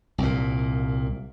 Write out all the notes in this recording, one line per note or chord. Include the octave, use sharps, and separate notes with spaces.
C2 A#2